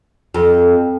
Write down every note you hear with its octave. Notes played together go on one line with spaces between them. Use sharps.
F2